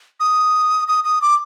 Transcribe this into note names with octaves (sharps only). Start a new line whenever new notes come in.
D#6
D#6
D#6
D6